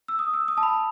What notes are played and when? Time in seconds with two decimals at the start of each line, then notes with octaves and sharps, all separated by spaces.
0.08 E6
0.19 D#6
0.34 E6
0.48 D#6
0.57 A5
0.63 B5